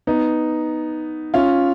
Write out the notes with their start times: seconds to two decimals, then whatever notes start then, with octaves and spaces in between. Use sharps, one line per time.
0.07 B3 D#4
1.34 C#4 F4